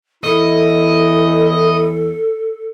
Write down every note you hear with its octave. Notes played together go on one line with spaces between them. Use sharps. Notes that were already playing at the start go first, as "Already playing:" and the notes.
E2 E4 A4 D#5